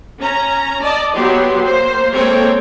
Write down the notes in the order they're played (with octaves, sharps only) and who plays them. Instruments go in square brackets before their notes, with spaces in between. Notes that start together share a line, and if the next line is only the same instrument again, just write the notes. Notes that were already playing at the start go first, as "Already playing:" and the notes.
[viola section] C#4 A#5
D5 D#5 A5
F#3 B3 G4 C6
A#3 C5
G#3 A#3 C4 A4 C#5 G5